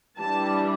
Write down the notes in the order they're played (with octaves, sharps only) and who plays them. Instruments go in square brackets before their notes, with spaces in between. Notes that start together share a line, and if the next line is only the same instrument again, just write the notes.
[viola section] E3 G3 D4 A5